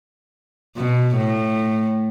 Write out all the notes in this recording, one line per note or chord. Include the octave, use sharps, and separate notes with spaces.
B2
A2